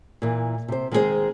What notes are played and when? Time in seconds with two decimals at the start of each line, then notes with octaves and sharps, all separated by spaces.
0.22 A#2 E3
0.68 C3 C5
0.92 D#3 G#3 C4 C#4 G#4 C5